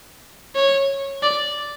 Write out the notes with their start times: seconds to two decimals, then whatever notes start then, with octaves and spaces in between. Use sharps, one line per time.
0.55 C#5
1.23 D5